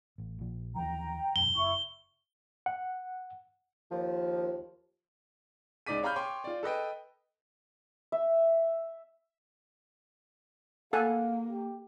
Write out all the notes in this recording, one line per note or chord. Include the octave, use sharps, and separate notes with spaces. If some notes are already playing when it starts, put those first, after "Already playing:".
A1
A#1 F3
D#2 E3 F3 G5 A#5
E1 F#2 G7
F#1 E4 C#6
F#5
D#2 F3
C#2 D#4 D5 D6 B6 D#7
C#5 F5 A#5 B5 F6 G6
C#5 G5 C6 D6
F4 D5
A4 B4 D#5 G5
E5
A#3 A4 F5 F#5 G#5
G4